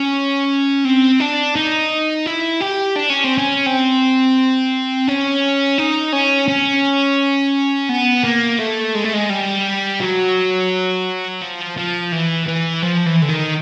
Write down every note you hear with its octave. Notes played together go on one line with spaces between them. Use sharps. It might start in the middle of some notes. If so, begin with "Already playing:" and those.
Already playing: C#4
C4
D4
D#4
E4
G4
D4
C#4
C4
C#4
C4
C#4
D#4
C#4
C#4
B3
A#3
A3
G#3
A3
G#3
G3
F#3
F3
F3
E3
E3
F3
E3
D3
D#3